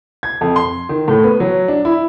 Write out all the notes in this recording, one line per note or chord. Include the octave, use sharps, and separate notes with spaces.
G#6
F2
C6
D#3
A2
B3
F#3
D4
E4